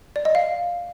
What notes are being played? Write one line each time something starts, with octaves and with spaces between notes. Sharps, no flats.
D5
D#5
F5